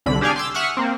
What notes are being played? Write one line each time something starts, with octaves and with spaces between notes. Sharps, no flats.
C2 D3 B5
D4 G4 G#4 D5 F5 G#5
C6 D6 E6
E5 F#5 C#6 D#6 F6 F#6
A#3 C4